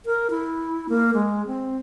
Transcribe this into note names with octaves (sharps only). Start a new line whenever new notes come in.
A#4
E4
A#3
G#3
C4